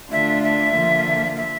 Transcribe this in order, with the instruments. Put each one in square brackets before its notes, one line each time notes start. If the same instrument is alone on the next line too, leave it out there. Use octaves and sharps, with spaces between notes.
[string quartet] D3 A3 D4 F4 [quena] E5
[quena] E5
[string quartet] D3 F3 A#3 F4
[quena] E5